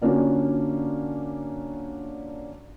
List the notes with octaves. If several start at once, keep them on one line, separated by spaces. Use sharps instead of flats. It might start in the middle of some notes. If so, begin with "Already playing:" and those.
D3 A#3 C#4 D4 F4 F#4